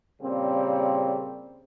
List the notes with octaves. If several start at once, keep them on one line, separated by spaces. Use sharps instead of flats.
A#2 C#3 G3 C4